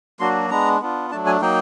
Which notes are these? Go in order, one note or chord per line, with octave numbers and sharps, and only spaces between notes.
F#3 A#3 D4 F#4 C6
G#3 B3 D4 A#5
B3 D4 F4
F#3 A3 D4 A5
G#5
F#3 A#3 D#4 G5